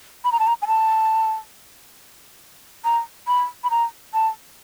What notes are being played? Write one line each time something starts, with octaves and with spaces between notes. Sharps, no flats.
B5
A#5
A5
A#5
G#5
A5
A#5
B5
B5
A#5
A5